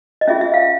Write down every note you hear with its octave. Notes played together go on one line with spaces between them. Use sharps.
D#5
C#4 F4 G#4 E5
E5
F5